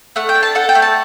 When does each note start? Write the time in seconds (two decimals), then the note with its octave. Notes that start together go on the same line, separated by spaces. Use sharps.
0.16 A3 F#5
0.29 G5
0.35 D4
0.43 A5
0.55 A4 F#5
0.69 G5
0.75 A3
0.82 A5